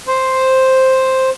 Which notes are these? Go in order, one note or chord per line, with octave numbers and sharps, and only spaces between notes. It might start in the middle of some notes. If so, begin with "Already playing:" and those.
C5